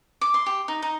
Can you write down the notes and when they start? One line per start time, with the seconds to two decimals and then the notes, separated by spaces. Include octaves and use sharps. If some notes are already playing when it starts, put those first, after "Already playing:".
0.21 D6
0.34 C6
0.46 G4
0.68 D#4
0.82 D#4